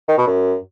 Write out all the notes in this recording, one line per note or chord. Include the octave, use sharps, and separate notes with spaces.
D#3
B2
F#2